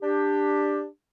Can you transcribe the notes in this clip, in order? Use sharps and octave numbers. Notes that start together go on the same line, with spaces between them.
D4 G4